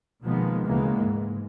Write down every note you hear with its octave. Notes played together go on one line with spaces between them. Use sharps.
B2 D#3 F3 G#3 A#3 B3
D2 C#3 E3 G#3 A#3 B3
G#2